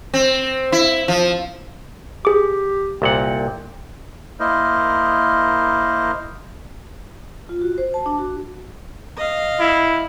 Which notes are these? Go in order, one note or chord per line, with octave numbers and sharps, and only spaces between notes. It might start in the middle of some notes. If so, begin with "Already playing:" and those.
C4
E4
F3
G4 G#4 D6
C2 A#2 F#5 G5
A#3 E4 A#4 C5 D#5
F4
F#4
C5
A5
D4
F#4
D#5 F5
E4